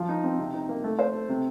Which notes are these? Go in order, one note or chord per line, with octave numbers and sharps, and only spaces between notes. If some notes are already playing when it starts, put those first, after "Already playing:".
Already playing: F3
D#4
C4
C3
D#4
A#3
A3
C5
A4
C3